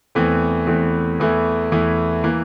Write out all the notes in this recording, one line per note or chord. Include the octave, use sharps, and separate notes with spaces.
E2 E3 A3 C4
E2 E3 A3 C4
E2 E3 A3 E4
E2 E3 A3 E4
E3 A#3